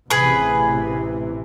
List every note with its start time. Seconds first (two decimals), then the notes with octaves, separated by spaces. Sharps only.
0.10 A1 C3 E3 G#4 B4